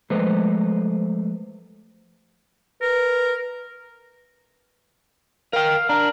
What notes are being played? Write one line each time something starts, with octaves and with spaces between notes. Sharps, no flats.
F3 G#3 A3 B4 C5
A#4 B4
A#4 F5 G5
D4 A#4